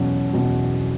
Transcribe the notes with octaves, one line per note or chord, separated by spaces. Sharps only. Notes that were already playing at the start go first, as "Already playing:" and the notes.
Already playing: E2 B2 F#3 C#4
E2 B2 F#3